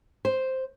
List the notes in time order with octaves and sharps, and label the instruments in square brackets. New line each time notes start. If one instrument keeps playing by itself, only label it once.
[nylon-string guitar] C5